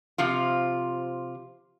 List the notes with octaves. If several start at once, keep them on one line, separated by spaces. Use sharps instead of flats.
C3 F3 F4